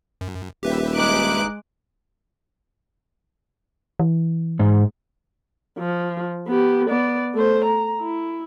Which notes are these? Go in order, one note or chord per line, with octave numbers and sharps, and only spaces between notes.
F#2
D#1 G4 B4 E5
G2 G#3 D#4 D6 F#6
E3
G#2
F3
B3 G4
B3 D5
A3 C5
A#5
E4